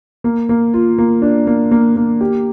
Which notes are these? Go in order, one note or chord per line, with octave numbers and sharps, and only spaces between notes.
A#3
A#3
F4
A#3
D4
A#3
A#3
A#3
G4